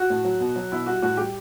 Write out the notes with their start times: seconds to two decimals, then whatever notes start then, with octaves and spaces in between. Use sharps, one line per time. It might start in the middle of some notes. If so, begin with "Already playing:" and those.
Already playing: F#4
0.10 A2
0.25 F#3
0.40 B2
0.56 F#3
0.72 B2 E4
0.86 G3 F#4
1.02 A2 F#4
1.17 G3 G4